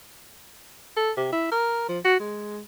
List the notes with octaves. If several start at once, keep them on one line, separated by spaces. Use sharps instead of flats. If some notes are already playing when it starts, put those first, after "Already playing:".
A4
C3
E4
A#4
F3
F#4
G#3